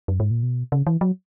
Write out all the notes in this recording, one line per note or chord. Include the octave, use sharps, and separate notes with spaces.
F#2
G#2
A#2
B2
C#3
E3
F#3